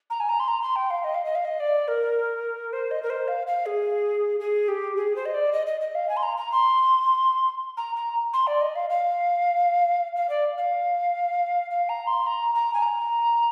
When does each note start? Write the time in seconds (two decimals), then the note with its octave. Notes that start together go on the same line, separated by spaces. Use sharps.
0.10 A#5
0.20 G#5
0.29 A#5
0.40 C6
0.48 A#5
0.62 C6
0.76 G5
0.90 F5
1.04 D#5
1.14 F5
1.25 D#5
1.35 F5
1.45 D#5
1.60 D5
1.88 A#4
2.73 C5
2.91 D#5
3.03 A#4
3.10 C5
3.28 F5
3.47 F5
3.66 G#4
4.40 G#4
4.68 G4
4.96 G#4
5.16 C5
5.26 D#5
5.34 D5
5.53 D#5
5.67 D#5
5.81 D#5
5.95 F5
6.09 G#5
6.17 C6
6.23 A#5
6.37 A#5
6.52 C6
7.77 A#5
7.96 A#5
8.33 C6
8.47 D5
8.61 D#5
8.76 F5
8.90 F5
10.16 F5
10.29 D5
10.58 F5
11.71 F5
11.89 A#5
12.07 C6
12.27 A#5
12.55 A#5
12.74 G#5
12.82 A#5